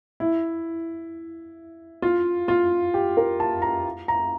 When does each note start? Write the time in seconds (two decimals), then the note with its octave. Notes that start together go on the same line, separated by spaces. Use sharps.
0.20 E4
2.02 F4
2.48 F4
2.94 G4
3.17 A#4
3.40 A5
3.62 A#5
4.08 A#5